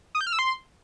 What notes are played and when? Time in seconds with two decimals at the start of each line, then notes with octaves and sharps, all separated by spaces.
0.15 D#6
0.21 G6
0.27 F6
0.33 E6
0.39 C6